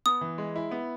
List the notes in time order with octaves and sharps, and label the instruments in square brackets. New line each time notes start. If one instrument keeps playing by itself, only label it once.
[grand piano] B3 [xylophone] D#6
[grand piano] E3
G#3
E4
B3